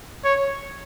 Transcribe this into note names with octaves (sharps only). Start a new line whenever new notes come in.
C#5